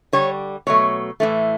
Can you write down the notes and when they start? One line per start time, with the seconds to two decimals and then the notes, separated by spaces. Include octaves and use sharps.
0.13 D3 G3 C#5
0.67 B2 F#3 A3 C#5
1.20 A2 E3 A3